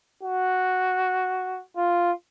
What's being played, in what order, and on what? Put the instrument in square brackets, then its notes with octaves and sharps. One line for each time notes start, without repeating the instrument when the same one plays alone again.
[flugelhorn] F#4
F4